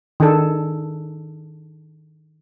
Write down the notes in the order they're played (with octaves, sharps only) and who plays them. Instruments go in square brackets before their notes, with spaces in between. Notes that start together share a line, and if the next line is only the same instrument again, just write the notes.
[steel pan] D#3 D4 G#4 A4